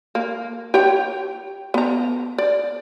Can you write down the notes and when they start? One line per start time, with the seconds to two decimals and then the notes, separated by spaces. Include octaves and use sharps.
0.15 A#3
0.74 G4 C#5 G5
1.74 B3 A#5
2.38 D5